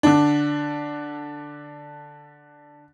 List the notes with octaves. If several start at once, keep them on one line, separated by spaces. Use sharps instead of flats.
D3 D4